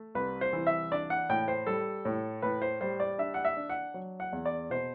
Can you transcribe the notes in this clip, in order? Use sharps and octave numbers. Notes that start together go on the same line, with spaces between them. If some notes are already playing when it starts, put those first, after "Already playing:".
Already playing: A3
C2 B4
C5
E3
E5
D4 D5
F#5
A2 G5
C5
G3 A4
A2
A2 B4
C5
G3 C5
D5
D4 E5
F#5
E5
D4
F#5
F#3
F#5
E2
D5
B2 C5